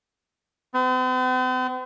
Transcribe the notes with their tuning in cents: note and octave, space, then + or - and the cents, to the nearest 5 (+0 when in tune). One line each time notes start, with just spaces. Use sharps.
C4 -45